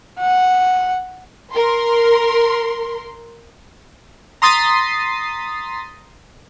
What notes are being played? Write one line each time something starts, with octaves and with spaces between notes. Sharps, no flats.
F#5
A#4 C6
A#5 C6 D#6 A6 B6 C7